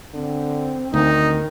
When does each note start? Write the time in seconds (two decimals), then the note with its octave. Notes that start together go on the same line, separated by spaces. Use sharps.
0.14 D3 C4
0.94 D2 D#3 D#4